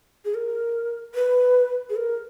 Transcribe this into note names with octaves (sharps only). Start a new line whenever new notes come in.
G#4
A#4
B4
G#4
A#4